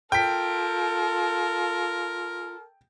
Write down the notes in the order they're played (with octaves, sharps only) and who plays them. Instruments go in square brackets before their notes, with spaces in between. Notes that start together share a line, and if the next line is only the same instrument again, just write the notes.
[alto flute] F4 [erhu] A4 [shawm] A#4 [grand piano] G5 B6